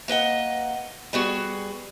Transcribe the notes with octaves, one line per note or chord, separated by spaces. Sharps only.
A#3 B4 D#5 F#5
G3 B3 F#4 G#4